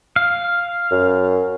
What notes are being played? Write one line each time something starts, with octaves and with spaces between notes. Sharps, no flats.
F5
F#2